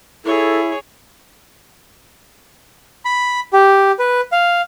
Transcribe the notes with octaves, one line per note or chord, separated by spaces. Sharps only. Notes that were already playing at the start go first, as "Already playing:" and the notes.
E4 G#4 A4 C#5
B5
G4
B4
F5